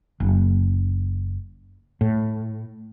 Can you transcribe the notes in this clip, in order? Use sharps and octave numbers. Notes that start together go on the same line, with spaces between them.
F#1
A2